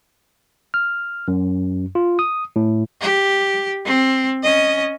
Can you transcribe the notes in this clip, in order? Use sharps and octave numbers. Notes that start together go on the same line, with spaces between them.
F6
F#2
F4
D#6
A2
G4
C4
C#4 D#5